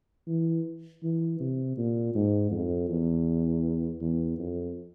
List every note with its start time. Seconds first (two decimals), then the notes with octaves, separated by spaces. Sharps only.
0.27 E3
1.03 E3
1.40 C3
1.77 A#2
2.15 G#2
2.51 F2
2.89 E2
4.01 E2
4.38 F2